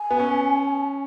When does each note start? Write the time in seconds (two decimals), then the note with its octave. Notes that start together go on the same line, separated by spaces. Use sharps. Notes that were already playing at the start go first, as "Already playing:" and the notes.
Already playing: G#5
0.11 B3
0.20 C#4